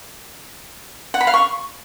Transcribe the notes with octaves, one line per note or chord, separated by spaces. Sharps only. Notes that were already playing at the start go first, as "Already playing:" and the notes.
F#5
B5
F5
C#6